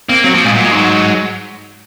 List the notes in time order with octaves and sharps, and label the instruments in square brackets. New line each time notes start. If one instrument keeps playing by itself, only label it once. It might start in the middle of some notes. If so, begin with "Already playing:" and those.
[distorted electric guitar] A#3 [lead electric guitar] C4
[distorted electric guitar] F#3 [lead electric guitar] C4
[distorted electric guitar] F3 [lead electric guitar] A#3
[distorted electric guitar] A#2 [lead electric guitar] G#3
[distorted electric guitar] A#2 [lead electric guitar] F#3
[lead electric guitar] G#3
[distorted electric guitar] G#2 [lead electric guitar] F#3